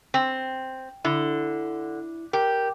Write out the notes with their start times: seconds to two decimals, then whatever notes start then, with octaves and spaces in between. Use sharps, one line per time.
0.14 C4
1.05 D3 E4
2.33 G4 A#4